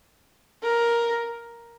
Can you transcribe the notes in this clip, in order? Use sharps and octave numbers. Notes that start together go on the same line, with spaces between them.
A#4